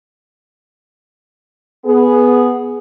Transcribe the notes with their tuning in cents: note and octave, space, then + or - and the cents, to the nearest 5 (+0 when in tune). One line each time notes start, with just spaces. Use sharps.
B3 +0 G#4 +10